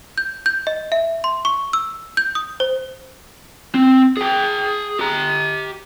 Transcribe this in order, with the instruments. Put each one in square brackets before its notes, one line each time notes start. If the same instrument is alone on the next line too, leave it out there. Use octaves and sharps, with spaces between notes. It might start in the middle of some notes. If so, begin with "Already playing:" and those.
[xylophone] G6
G6
D#5
E5
C6
C#6
E6
G6
D#6
C5
[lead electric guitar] C4
G#4 G5
G4 A#5